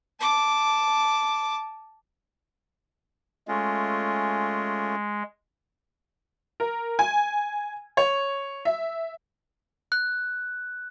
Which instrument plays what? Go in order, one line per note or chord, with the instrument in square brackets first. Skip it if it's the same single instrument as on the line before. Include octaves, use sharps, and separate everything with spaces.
[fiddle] A5 D6
[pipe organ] G#3 [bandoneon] A3 C#4 F4
[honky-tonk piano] A#4
G#5
C#5
E5
[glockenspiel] F#6